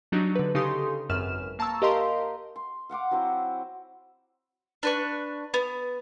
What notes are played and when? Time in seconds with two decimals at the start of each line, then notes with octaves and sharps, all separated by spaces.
0.12 F#3 D4 D#4 F#4 G4
0.35 D3 B4
0.55 C#3 D#4 G4 A4 C6 D#6
1.09 G#1 F#2 B4 F6 E7
1.59 A#3 A5 A#5 C#6 E6
1.82 G4 A#4 D#5 F5 A#5 C6
2.56 C6
2.89 F5 F#5 C6 D6
3.11 F#3 C4 E4 C5
4.83 D4 B4 C#6
5.54 B3